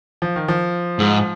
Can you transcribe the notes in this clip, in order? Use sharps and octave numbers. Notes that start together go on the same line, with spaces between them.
F3
D#3
F3
G#2